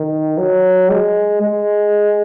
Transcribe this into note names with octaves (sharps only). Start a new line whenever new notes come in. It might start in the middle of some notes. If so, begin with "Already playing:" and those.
Already playing: D#3
F#3
G#3
G#3